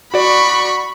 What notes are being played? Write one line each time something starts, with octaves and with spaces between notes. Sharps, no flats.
F#4 D5 B5 C#6